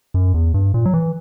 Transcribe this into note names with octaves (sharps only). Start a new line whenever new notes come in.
F#2
E2
G2
A#2
F#3
E3